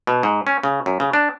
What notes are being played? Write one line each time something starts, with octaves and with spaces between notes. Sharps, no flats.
B2
G#2
C#4
C#3
F#2
C#3
D4